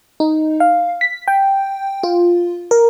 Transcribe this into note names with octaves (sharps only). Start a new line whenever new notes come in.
D#4
F5
B6
G5
F4
A#4